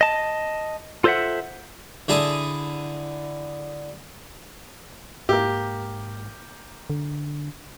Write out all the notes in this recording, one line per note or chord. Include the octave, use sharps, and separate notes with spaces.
D#5 A5
F4 A4 C5 D5 E5 F#5
D3 E4 G#4 A5 D#6
G#2 A#3 G4
D3